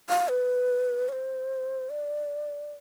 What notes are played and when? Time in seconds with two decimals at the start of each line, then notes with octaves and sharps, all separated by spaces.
0.09 F5
0.28 B4
1.09 C#5
1.12 C5
1.90 D5